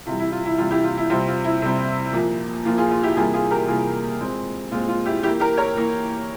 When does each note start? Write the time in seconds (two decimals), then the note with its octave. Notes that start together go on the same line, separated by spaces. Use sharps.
0.06 C3 E3 G3 F4
0.19 E4
0.32 F4
0.46 E4
0.58 C3 E3 G3 F4
0.71 E4 G4
0.84 F4
0.97 E4
1.10 C3 G3 C4 F4
1.27 F4
1.44 E4
1.62 C3 G3 C4
2.13 A#2 F3 A#3
2.65 A#2 F3 A#3 F4
2.77 F4 G#4
2.91 F4
3.03 E4 G4
3.16 C3 E3 G3 A#3 F4 G#4
3.34 F4 G#4
3.51 G4 A#4
3.68 C3 E3 G3 A#3 F4 G#4
4.20 A#2 G#3 C4
4.71 A#2 G#3 C4 F4
4.88 F4
5.05 E4 G4
5.23 E3 A#3 E4 G4
5.40 G4 A#4
5.57 A#4 C#5
5.75 E3 A#3